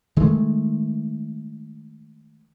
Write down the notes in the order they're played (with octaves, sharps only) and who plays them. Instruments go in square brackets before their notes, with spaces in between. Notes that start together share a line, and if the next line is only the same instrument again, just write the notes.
[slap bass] D#3 G#3 A3